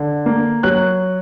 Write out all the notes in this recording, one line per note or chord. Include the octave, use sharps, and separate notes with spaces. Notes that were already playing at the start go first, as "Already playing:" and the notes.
Already playing: D3
A#3
F#3 F#6